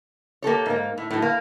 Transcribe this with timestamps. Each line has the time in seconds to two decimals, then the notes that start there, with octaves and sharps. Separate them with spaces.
0.42 A#3 G4 A4 C#5
0.66 G#2 A#3
0.98 A2
1.11 A2 F#3
1.22 A#3